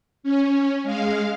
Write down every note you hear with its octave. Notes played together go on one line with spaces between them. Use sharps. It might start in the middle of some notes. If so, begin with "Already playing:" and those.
C#4
G#3 F5